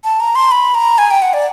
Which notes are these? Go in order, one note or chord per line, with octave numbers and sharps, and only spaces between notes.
A5
A#5
C6
B5
A#5
G#5
G5
F#5
D5